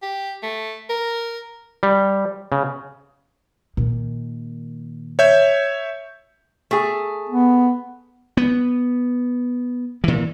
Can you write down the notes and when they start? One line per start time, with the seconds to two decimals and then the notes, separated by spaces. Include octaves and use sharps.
0.02 G4
0.43 A3
0.90 A#4
1.83 G3
2.52 C#3
3.77 A#2 D#3
5.19 C#5 E5 G6
6.71 A3 G#4
7.30 B3
8.37 B3
10.04 A#2 E3